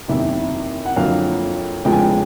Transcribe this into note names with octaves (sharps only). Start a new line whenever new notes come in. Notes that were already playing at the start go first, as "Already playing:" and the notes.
F#1 E2 C3 D#3 E5
F#5
F#1 F2 D3 F#3 A#3 F5
F1 E2 C#3 F3 G#3 G5
G#5
G5